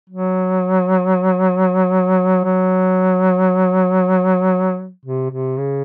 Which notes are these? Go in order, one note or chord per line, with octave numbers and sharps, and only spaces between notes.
F#3
F#3
C3
C3
C#3